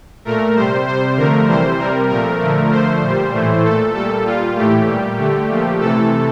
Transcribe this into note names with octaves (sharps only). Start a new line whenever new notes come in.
A#2 A3 A#4
C3 G3 C5
C3 G3 C5
D3 F3 A3 A#4
C3 E3 G3 C5
C3 G3 A#4
A#2 F3 A3 A#4
D3 F3 A3
D3 F3 A3 C5
A#2 G3
A2 E3 A3
A#2 A3 A4
A#2 G3 A4
A#2 G3 F4
A2 E3 A3 G4
A#2 G3
D3 A3
A#2 F3 A3
C3 E3 A3 A4